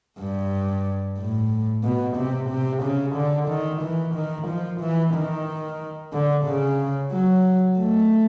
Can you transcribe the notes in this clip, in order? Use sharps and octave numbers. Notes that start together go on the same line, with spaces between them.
G2
A2
B2
C3
C3
C#3
D3
D#3
E3
D#3
F3
E3
D#3
D3
C#3
F#3
A3